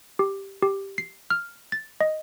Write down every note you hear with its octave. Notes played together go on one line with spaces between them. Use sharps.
G4
G4
C7
F6
A6
D#5